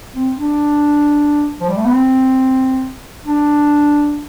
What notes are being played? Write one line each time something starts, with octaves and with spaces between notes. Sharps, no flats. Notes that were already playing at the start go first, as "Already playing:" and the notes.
C4
D4
F3
G3
A3
B3
C4
D4